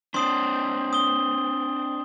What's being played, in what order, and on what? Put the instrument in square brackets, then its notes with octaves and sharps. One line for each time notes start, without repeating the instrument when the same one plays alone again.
[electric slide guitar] C4 D4 [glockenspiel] C6 D#6 C7
[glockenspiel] D#6 G7